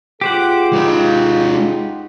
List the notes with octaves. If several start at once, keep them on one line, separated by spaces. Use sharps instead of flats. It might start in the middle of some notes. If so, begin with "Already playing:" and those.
F4 G4 G#4 C5 F#5 D6
G#3 D#4 B4